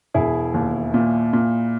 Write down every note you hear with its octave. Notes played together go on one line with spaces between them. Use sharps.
E1 E4 G#4
D#2
A#2
A#2